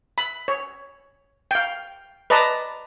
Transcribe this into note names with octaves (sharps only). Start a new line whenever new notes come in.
B5
C#5
F5 G5
B4 D5 D#5 A5 A#5